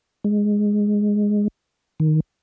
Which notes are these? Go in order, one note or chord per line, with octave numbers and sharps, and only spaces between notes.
G#3
D#3